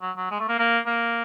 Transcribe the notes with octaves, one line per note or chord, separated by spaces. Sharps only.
F#3
F#3
G#3
A3
A#3
A#3
A#3